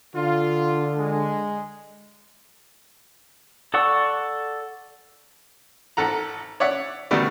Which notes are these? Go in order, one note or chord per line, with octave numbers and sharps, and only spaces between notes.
D3 F4
G#3
A4 D5 F#5 C#6 E6
G#1 A4 F#5 A#5
C#5 D5 E5 F#5
B2 D3 D#3 G3 A3